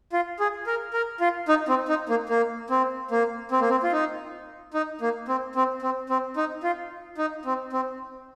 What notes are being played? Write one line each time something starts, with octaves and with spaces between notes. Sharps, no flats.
F4
G#4
A#4
A#4
F4
D#4
C4
D#4
A#3
A#3
C4
A#3
C4
A#3
C4
F4
D#4
D#4
A#3
C4
C4
C4
C4
D#4
F4
D#4
C4
C4